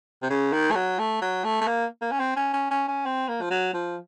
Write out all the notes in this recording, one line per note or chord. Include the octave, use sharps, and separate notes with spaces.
C3
C#3
D#3
A3
F#3
A3
F#3
A3
A3
A#3
A#3
C#4
C4
C#4
C#4
C#4
C#4
C4
A#3
F3
F#3
F3